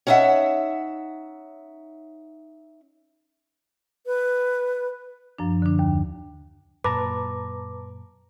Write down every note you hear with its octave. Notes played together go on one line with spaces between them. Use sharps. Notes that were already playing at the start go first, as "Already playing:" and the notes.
C#4 D#4 E4 D#5 E5 F#5
B4
F#2 F3 D4
D3 D4
D#2
F#2 A#2 B4 A5 A#5 D6